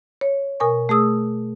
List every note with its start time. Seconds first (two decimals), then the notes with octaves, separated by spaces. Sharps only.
0.21 C#5
0.60 B2 A#4 G#5 C#6
0.89 A3 G#4 D#6 E6